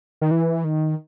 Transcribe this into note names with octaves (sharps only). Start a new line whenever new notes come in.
D#3
E3
D#3